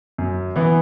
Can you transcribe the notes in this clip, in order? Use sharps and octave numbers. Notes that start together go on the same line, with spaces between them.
F#2
E3 B3